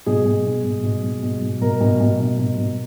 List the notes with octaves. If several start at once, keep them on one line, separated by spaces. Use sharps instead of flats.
B2 G#4
B2
B2
B2
B2
B2
B2
B2
B2 A#4
B2
B2
B2
B2
B2